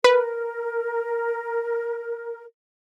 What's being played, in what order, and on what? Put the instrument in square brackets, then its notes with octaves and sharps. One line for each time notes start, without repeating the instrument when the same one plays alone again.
[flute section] A#4 [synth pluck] B4